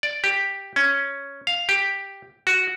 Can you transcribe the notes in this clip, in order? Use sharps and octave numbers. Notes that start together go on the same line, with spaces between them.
D5
G4
C#4
F5
G4
F#4